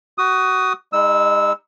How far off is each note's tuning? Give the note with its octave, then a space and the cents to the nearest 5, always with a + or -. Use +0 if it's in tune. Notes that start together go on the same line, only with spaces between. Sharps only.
F#4 +20 D#6 +0
G#3 -40 D#4 +10 E6 -15